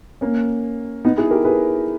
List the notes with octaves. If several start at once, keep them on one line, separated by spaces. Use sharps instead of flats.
A#3 C#4
B3 D#4
E4 G#4
G4 A#4
G#4 B4